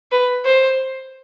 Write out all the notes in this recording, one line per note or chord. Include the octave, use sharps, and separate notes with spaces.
B4
C5